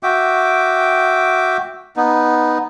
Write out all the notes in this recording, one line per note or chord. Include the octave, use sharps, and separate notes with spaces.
F#4 E5 G5 D6
B3 D#4